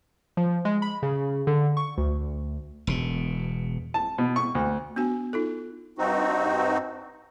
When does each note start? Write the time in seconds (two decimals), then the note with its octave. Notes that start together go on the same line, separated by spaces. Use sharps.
0.37 F3
0.65 G#3
0.82 B5
1.03 C#3
1.47 D3
1.77 C#6
1.98 D2
2.87 E1 B2
3.94 A5
4.18 B2
4.36 C#6
4.55 D2
4.96 B3 D4 F#4 G#5
5.33 D#4 F4 A4
5.98 G2 C4 D#4 F#4